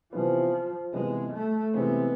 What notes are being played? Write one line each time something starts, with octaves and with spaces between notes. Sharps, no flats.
C3 E3 F3 B3
C3 E3 G#3 B3
A3
C3 E3 G#3 B3 C4